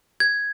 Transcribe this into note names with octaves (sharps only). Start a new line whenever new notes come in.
G#6